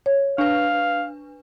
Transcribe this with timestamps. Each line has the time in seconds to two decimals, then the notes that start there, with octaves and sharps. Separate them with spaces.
0.06 C#5
0.38 D4 B4 F5